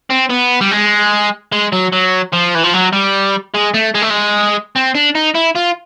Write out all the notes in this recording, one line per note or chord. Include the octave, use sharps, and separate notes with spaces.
C4
B3
G3
G#3
G#3
F#3
F#3
F3
E3
F3
F#3
G3
G#3
A3
G#3
A3
G#3
C4
D4
D#4
E4
F4